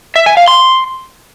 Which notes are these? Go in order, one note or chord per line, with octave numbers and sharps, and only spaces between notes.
E5
G#5
F5
C6